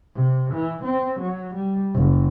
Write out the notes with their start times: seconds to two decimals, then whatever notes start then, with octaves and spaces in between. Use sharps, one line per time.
0.15 C3
0.54 E3
0.84 C4
1.21 F#3
1.56 G3
1.95 F#1